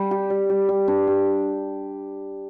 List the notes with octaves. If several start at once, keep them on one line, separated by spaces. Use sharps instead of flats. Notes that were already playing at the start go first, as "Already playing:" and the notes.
Already playing: G3
G4
G3
G3
G3
D4
G4